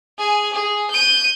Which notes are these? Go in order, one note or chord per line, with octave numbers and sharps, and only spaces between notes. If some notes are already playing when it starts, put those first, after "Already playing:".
G#4 G#5
G#4
G6 D#7